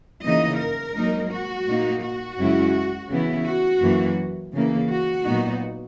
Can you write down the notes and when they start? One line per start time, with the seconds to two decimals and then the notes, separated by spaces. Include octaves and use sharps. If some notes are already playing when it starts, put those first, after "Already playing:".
0.22 C#3 E3 A#3 D#4 D#5
0.58 A#4
0.94 G#2 F#3 A#3 D#4
1.31 F#4
1.66 A#2 A#3 D#4
2.02 F#4
2.38 F#2 C#3 G#3 C#4 E4
3.09 C#3 E3 B3 E4
3.46 F#4
3.82 F#2 E3 A#3
4.53 C#3 E3 A#3
4.88 F#4
5.25 A#2 F#3 B3 D#4